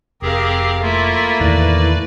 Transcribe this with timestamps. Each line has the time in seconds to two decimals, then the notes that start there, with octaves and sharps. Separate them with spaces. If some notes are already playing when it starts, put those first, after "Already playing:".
0.22 F1 C4 G4 G#4 A#4 F5
0.82 A3 A#3 E4 F4 E5
1.40 E2 A2 D#3 E4 B4 D5